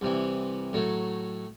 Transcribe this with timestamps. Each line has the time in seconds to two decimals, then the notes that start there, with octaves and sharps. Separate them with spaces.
0.01 C2 C3 E3
0.73 A2 F#3 A3